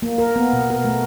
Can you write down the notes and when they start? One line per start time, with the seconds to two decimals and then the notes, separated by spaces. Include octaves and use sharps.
0.02 A#3
0.18 A#4
0.36 B3
0.53 B2
0.70 A#4
0.85 A3